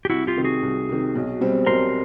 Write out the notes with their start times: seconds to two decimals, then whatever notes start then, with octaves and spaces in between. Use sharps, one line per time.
0.05 G4
0.10 C2 E4 F#4
0.27 F4 G4
0.36 C3 D#3
0.44 F#4 G#4
0.63 C2
0.89 C3 D#3
1.15 B1
1.41 B2 G3 C4
1.67 B1 A#4 C5